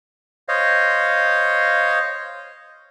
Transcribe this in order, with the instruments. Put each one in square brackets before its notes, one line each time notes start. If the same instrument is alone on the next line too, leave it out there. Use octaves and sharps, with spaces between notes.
[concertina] C5 C#5 D#5 F5